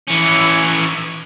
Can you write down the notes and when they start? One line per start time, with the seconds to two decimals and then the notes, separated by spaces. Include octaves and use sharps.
0.08 E3 C#4